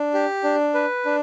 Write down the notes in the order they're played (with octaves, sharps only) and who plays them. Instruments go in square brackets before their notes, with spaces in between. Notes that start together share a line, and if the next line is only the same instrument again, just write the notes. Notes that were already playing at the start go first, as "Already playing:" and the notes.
Already playing: [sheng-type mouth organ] D4
G4
D4
B4
D4